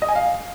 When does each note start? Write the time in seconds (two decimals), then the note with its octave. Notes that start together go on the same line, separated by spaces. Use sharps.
0.02 D#5
0.08 G#5
0.15 F5